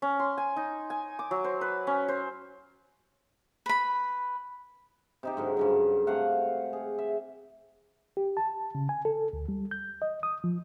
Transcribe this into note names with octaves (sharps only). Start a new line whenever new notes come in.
C#4
C6
G#5
D#4
G#5
D6
F#3
C5
B4
C#4
C5
B4 B5
C3 D#4 G4
G#2 D3 F#3
G2 C#3 F#3
C3 A3 F5 F#5
G#4
E5
G4
A5
C#3
G#5
A4
D2
G3
G6
D#5
D#6
F3